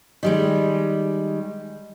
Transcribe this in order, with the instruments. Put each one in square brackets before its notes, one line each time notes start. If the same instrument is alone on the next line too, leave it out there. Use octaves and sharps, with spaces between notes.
[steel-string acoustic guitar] D#3 G3 G#3